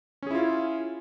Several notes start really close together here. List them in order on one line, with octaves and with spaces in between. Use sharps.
C#4 G#4 E4 F4